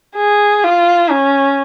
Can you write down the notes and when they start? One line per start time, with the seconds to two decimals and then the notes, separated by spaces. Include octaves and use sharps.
0.16 G#4
0.64 F4
1.10 C#4